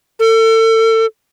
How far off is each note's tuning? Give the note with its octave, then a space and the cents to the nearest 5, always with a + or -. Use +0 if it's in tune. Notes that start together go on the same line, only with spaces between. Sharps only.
A4 +35